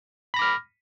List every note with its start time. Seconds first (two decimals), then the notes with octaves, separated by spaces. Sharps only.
0.34 B5
0.36 A#6
0.39 D6
0.42 F6